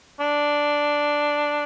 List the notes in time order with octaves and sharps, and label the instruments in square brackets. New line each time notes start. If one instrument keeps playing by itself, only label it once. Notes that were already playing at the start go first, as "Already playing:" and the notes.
[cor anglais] D4